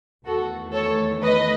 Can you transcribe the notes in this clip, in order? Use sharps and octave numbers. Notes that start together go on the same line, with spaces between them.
E2 D#3 A3 F#4 A4
A4 C#5
B4 D#5